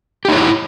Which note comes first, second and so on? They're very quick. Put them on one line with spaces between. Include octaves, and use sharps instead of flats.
G4 D#4 C#5 E4